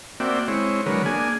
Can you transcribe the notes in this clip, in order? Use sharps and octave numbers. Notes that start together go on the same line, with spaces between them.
A#3 C4 F#4 D5 E5 G5
G#3 C4 E4 C#5
D3 F#3 G#3 A#4 B4 C#5
A#3 D4 G#4 G#5